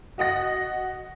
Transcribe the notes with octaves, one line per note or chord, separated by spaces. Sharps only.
F#4 D#5 F#5 A#6